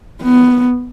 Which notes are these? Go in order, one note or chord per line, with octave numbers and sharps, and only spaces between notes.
B3